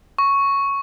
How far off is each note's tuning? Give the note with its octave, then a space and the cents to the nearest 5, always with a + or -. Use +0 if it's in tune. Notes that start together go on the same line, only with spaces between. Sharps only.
C#6 +0